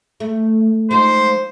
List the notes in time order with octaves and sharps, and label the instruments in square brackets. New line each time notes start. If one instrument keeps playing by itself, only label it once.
[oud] A3
[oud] F3 G#3 D#4 [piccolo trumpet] C5